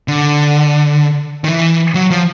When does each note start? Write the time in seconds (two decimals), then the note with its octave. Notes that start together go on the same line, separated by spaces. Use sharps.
0.08 D3
1.44 D#3
1.48 E3
1.95 F#3
2.11 F3